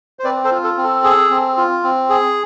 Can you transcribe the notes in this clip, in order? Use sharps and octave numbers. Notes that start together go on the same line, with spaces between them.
C5
C4 B4 D5
A4 C5
F4
A4
C4
A4
G#4
C4
F4
C4
G#4